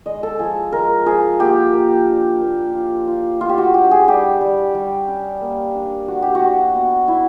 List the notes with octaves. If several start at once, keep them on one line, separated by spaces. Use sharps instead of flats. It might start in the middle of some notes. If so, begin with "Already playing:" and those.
G#3 D#5
A4
F3 G#4
G#3 A#4
F3 G#4
A#3 G4
A#3
D4
A#3
F4
F4
A3 F4
G4
F#4
D4 G4
G#4
G3 G4
G3
G3
C#4
A#3
D4
D4 F#4
G4
F#4
D4
B3
E4